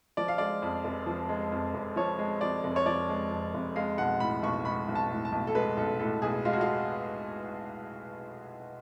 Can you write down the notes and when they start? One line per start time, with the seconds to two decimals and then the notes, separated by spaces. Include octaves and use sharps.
0.17 F3 D5
0.28 F5
0.38 G#3 D5
0.62 F2
0.84 F1
1.06 F3
1.29 G#3
1.52 F2
1.74 F1
1.96 F3 C#5
2.19 G#3
2.41 F2 D5
2.64 F1
2.76 C#5
2.86 F3 D5
3.09 G#3
3.31 F2
3.54 F1
3.76 G#3 F5
3.98 B1 F#5
4.20 A2 B5
4.42 B1 C#6
4.65 G#3 B5
4.88 B1
4.95 A5
5.11 A2
5.25 A5
5.32 B1
5.47 A4
5.55 G#3 B4
5.77 B1 A4
6.00 A2 A4
6.22 B1 G#4
6.45 G#3 F4
6.53 F#4
6.61 F4